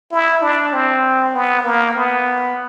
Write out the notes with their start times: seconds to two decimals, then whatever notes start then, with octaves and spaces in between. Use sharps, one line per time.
0.12 E4
0.42 D4
0.73 C4
1.34 B3
1.64 A#3
1.95 B3